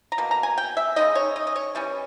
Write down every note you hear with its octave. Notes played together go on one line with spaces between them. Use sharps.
A#5
B2 A#3
A#5
G#5
G5
E5
C#3 G#3 D#4 D#5
C#5
D#5
D#5
C#5
E3 G3 C#4